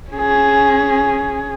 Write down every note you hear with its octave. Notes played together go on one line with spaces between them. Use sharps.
C#4 G#4